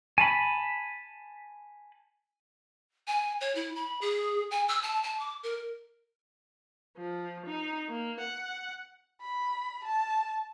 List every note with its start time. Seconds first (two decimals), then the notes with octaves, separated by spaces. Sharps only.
0.18 G#5 A5 B5
3.07 G#5
3.41 C#5
3.55 E4
3.76 B5
4.01 G#4
4.51 G#5
4.68 E6
4.83 A5
5.03 A5
5.20 D6
5.43 A#4
6.98 F3
7.46 D#4
7.88 A#3
8.19 F#5
9.21 B5
9.85 A5